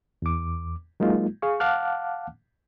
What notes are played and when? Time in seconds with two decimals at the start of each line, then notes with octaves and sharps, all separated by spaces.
0.22 E2 D6
1.00 F#3 G#3 A#3 D#4 F4
1.42 G#4 F5 C#6
1.60 F5 F#5 A5 D6 F6 F#6